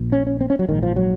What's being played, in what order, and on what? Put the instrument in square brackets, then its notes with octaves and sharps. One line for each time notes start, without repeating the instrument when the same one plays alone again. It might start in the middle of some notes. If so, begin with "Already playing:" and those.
Already playing: [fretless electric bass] A#1 A#2
C#4
C#4
C4
C#4
F#3
A#1 G#2 D#3
F3
F#3